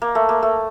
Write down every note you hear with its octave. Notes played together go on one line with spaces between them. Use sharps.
A#3
A3
A#3
A3